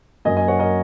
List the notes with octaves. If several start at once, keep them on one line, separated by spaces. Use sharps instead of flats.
F#2 F#3 A#3 D#5 G#5
D#5 G#5
C#5 F#5
A#4 D#5